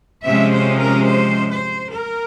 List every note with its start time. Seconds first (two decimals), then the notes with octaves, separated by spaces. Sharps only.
0.25 C3 F3 G#3 C#4 E5
0.53 C5
0.81 A#4
1.09 C5
1.51 C5
1.93 A#4